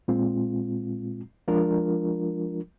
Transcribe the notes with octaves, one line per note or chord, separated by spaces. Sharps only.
A#2 G#3 C4 F4
F3 G#3 D4 F4 A#4